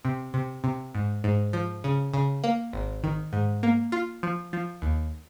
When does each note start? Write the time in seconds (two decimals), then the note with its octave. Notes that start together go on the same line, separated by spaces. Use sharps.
0.05 C3
0.34 C3
0.64 C3
0.95 G#2
1.24 G#2
1.53 F3
1.84 C#3
2.14 C#3
2.44 A#3
2.73 G#1
3.04 D#3
3.33 G#2
3.63 A#3
3.92 F4
4.23 F3
4.53 F3
4.82 D#2